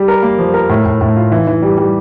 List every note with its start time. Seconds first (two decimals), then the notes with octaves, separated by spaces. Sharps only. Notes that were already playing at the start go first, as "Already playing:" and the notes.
Already playing: G3
0.08 A#4
0.23 A#3
0.39 F3
0.54 A#4
0.69 A2
0.86 A2
1.01 A2
1.16 F4
1.32 E3
1.47 E3
1.62 G3
1.78 G3